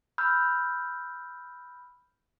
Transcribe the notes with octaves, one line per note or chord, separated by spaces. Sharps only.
B5 E6 F6 G6